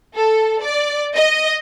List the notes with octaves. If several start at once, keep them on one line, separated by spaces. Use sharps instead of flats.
A4
D5
D#5